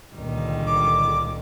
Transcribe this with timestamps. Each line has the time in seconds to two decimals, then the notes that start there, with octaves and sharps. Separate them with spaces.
0.14 C#2 A#2 D3 D#3 G3
0.66 D6